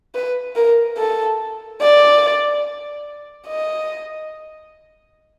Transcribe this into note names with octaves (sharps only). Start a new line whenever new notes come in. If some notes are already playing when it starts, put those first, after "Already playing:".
B4
A#4
A4
D5
D#5